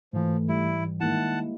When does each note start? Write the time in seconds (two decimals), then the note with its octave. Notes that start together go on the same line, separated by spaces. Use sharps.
0.13 G#2 E3 F3 A3
0.49 G3 E4
1.00 D#3 G#3 A#3 E4 F#5 A5